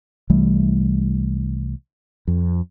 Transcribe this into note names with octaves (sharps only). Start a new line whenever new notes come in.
C2 E3 G3 A3
F2